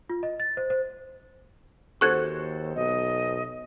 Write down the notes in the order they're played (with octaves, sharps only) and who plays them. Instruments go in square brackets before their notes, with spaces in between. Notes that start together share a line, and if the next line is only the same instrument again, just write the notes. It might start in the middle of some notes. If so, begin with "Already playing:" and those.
[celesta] F4
D#5
A6
C5
C5
[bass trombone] D#2 [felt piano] F#4 A4 C5 [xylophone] C#6 F#6 G#6
[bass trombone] B1 [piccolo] D#5